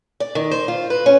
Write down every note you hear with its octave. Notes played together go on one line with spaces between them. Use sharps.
D5
D#3
C5
F4
B4
C#4